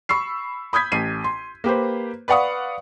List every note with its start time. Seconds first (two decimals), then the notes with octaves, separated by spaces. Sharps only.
0.09 B5 C#6 E6 C7
0.73 B5 D#6 G6 G#6 B6
0.92 A1 C7 D#7
1.24 C6
1.64 A#3 G4 B4 C5
2.28 B4 D5 F5 F#5 C#6 D#6